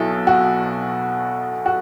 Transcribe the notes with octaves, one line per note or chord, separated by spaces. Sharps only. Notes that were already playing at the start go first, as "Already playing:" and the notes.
Already playing: B1 B2 E4 A4
F#4
F#4